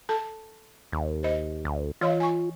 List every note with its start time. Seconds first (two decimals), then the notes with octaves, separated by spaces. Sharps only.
0.09 A4 A5
0.92 D#2
1.23 C5 D#5
1.65 D2
2.01 E3 F4 C#5 D#5
2.20 G#5 C#6